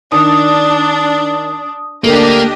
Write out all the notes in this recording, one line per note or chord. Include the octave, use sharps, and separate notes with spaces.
D#3 D4 D#6
D2 A#3 D4 G4 A4 A#4 D#5